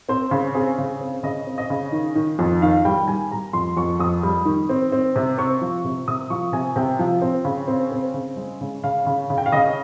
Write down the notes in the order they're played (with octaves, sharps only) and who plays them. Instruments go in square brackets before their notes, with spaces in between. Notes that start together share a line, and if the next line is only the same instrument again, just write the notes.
[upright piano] C4 C5
C#3
C4 G#4
C#3
C4
C#3 D#5
C4
D#5
C#3
D#3
D#3
F2
D#3 F5
G3 G5
G3 G#5
G3 A#5
F2 C6
F2 C#6
F2 D#6
G3
D#3
C4
C4
C3
C4 C#6
F3
C3
C3 D#6
F3 C#6
C3 G#5
C3 G5
F3
C4
C#3
C4
C4
C#3
G#3
C#3
C#3 F5
C#3
C#3
G5
F5
C#3 D#5